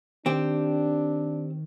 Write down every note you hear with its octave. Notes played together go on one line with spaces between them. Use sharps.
D#3 C4 D4 G4